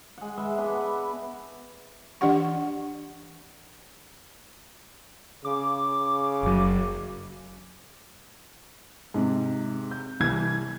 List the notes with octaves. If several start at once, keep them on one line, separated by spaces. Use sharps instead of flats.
G#3 F#5
G#3 B4 E5
B3 D4 B4
B3
E3 D4 G4 F#5 C#6
C#3 D6
F#1 F#3
G#2 C3
G6
C2 E3 G#6